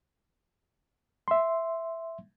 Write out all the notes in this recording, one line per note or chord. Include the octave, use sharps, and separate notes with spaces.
E5 C6